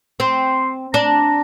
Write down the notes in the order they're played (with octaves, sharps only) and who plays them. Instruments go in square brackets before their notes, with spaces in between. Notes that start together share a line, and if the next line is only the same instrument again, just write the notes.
[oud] C4 [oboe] C6
[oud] D4 [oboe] A#5